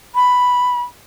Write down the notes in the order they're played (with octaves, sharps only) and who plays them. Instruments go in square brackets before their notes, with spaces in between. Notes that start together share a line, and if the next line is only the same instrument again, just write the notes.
[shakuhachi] B5